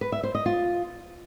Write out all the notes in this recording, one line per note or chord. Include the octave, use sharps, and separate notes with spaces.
B4
E5
C5
D#5
F4